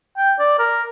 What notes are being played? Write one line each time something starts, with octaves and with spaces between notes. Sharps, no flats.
G5
D5
A#4